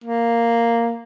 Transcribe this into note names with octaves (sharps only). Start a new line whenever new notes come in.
A#3